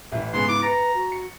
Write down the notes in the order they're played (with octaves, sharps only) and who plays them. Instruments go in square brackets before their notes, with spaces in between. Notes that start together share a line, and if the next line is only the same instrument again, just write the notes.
[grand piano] A1 E3 [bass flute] E5
[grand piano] G#2 C#3 B3 [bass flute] G#4 [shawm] C6
[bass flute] E4 [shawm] D6
[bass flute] B4 [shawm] A#5 [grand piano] A6 A#6 C#7
[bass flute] F#4
[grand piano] C#7